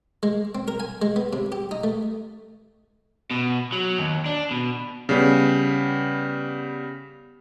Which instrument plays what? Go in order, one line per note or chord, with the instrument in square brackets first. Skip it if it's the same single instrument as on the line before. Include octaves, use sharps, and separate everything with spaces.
[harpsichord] G#3
C4
A#4
G#5
G#3
B3
C3
G4
D#4
A3
[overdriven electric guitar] B2
F#3
D#2
D4
B2
[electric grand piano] C#3 G3 B3